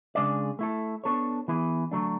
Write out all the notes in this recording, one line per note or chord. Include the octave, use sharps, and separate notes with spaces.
C#3 G#3 D4 G#4 D5
A3 E4 A4
B3 D4 A4 C#5
E3 B3 E4 G#4
D3 F#3 A3 D4